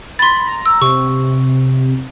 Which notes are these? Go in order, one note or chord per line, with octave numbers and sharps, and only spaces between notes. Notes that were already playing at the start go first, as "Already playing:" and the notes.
B5 C6 A6
A#5
E6
C3 C#6